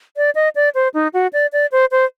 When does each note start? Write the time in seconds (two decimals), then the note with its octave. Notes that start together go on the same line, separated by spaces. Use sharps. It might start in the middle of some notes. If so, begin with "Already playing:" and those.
0.17 D5
0.35 D#5
0.56 D5
0.75 C5
0.94 D#4
1.14 F#4
1.33 D5
1.53 D5
1.72 C5
1.91 C5